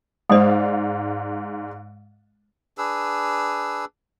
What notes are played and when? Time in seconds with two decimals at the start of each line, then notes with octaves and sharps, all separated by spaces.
0.30 G#2 G#3 C5 D5 F5
2.78 D4 G#4 B4 E6